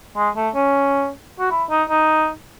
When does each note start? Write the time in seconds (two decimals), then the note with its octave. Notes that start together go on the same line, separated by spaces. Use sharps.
0.16 G#3
0.36 A3
0.55 C#4
1.39 F#4
1.51 E4
1.70 D#4
1.89 D#4